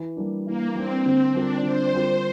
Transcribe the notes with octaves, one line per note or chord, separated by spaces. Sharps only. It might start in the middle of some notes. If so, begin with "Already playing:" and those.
Already playing: E3
G3 A#3 D4
E3 A#3
G3 A#3 C4 D4
D3 C4
G3 C4 D4 F4 A#4
D3 C5
G3 C4 F4 A#4